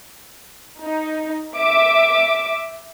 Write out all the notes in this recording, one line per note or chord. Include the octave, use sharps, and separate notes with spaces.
D#4
E5 D6